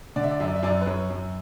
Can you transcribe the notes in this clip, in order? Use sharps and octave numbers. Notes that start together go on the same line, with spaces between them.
D3 D5
E5
D5
F#2 E5
D5
E5
F#2 D5
B4
F#2 C#5
F#2